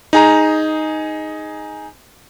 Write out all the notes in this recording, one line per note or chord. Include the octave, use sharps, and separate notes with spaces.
D#4 G#4 A#5